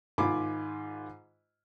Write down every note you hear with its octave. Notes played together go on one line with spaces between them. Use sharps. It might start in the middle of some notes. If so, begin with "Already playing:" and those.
G#2 D#3 F4 G#5 B5 D6